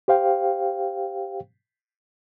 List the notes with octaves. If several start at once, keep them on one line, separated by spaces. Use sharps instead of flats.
G4 C5 F5 G5